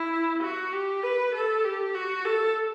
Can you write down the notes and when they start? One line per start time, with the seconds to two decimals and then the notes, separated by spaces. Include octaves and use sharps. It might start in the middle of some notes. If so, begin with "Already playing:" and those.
Already playing: E4
0.42 F#4
0.73 G4
1.03 B4
1.34 A4
1.64 G4
1.94 F#4
2.25 A4